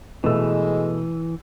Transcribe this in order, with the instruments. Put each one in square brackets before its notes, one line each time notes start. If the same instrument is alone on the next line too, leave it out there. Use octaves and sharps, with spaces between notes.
[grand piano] B2 A3 E6 [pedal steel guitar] E3 [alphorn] G#3